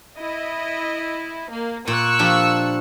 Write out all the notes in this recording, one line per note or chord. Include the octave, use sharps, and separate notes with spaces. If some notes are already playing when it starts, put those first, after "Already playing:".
E4 D#5
A#3
A#2 C#6 E6 F#6
F3 D4 G4